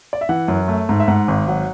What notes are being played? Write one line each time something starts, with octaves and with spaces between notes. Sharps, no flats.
D5
E5
E3 F#5
F#2
A3
G#2
E5
G#2 F#5
G#1
F#3 F#5